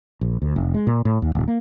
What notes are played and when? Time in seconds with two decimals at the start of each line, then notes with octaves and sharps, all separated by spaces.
0.21 A#1
0.42 D2
0.56 F1
0.74 G#3
0.87 A#2
1.05 A2
1.22 D#2
1.35 D1
1.48 A#3